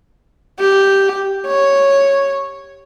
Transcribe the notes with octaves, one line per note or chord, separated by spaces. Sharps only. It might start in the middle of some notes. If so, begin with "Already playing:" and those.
G4
C#5